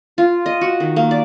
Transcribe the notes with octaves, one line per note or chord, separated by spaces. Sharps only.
F4
D#5
F#4
D#3
A#3
D5